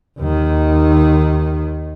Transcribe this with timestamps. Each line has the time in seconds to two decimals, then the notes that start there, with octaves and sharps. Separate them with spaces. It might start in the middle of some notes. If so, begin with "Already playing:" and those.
0.19 D#2 D#3